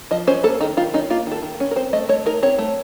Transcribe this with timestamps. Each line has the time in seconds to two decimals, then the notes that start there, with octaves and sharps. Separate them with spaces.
0.11 F3 D#5
0.27 C#4 C5
0.44 A#3 A4
0.61 D#3 D#4
0.77 D#3 F4
0.94 C#4 D#4
1.10 A#3 F4
1.27 D#3 A4
1.43 D#3
1.60 C#4
1.71 A#4
1.76 C4 C5
1.93 A3 D#5
2.09 A3 C#5
2.26 D#4 A#4
2.43 C4 C#5
2.58 A3